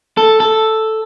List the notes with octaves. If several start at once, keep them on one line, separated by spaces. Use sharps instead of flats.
A4
A4